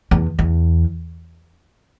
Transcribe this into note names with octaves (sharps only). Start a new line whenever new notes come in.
E2
E2